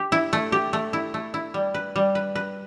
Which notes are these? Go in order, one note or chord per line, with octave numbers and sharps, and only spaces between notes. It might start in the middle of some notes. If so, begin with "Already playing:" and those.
Already playing: G4
E4
A3
G4
A3
E4
A3
E4
G3
B4
G3
B4
B4